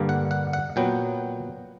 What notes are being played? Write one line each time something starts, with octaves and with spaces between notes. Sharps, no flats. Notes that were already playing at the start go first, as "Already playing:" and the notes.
Already playing: G2 D3 G3 A#3
F#5
F#5
F#5
A#2 F#3 B3 G5